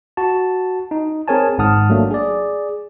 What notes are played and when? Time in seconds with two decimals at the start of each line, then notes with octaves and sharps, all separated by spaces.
0.17 F#4 A5
0.91 D#4
1.28 C4 G#4 A#4 C#5 G#5 A5
1.58 G#1 G#2 F#5 A5 D#6 F6
1.90 F#3 A3 A#3 D4
2.11 G#4 D5